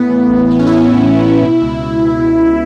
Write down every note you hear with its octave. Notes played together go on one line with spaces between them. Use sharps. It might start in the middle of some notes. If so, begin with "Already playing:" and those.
Already playing: A2 B3
E3
A1
A1 B3
C#4
A2 E4
E3
A1
A1
B2
C#2
B2
C#2
B2
C#2